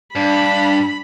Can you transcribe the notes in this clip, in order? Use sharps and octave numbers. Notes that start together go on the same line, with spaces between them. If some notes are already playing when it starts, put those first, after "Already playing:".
G2 D4 B5